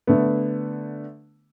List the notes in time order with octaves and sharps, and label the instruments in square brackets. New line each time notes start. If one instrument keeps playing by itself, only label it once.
[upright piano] D3 A3 B3